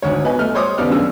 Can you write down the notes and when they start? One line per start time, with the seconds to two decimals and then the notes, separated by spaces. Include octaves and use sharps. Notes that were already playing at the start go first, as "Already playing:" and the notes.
0.02 D2 G#2 C#5
0.24 B3 B4 D#5 G#5
0.39 A3 D#5 F6
0.55 C5 C#5 C6 D6 D#6
0.78 D#2 C#3 B3 D5 F6
0.90 F#2 C#4 D4 G#4 E6